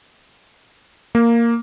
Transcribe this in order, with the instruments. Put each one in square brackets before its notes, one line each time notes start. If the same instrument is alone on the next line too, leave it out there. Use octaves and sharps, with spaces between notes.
[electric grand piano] A#3